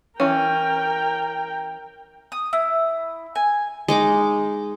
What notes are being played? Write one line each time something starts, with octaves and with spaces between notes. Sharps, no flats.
E3 C#4 A#4 G5
D#6
E4
G#5
G#3 D#4 D6